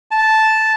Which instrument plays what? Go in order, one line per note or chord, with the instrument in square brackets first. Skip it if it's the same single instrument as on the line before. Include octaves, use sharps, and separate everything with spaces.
[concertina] A5